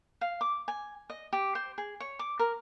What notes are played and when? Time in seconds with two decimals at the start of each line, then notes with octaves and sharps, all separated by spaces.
0.21 F5
0.41 D6
0.68 G#5
1.10 D#5
1.33 G4
1.55 C5
1.78 G#4
2.00 C#5
2.19 D6
2.39 A#4